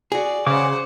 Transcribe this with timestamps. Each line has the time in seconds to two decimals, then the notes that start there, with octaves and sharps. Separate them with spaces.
0.12 F#4 G#4 D5
0.47 C#3 C5 F#5 D6